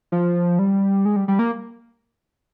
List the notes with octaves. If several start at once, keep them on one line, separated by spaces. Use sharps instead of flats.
F3
G3
G#3
G3
G3
A#3